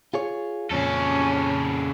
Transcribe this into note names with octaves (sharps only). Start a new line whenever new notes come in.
F4 G#4 C#5
F2 A#2 C#3 C#4 A4